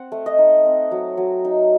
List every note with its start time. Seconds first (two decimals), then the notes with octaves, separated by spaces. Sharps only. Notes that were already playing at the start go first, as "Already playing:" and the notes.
Already playing: C4 F#5
0.12 A3
0.26 D#5
0.38 D#4
0.65 C4
0.91 F#3
1.17 F#3
1.45 D#4